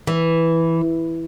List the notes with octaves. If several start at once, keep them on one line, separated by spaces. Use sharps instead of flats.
E3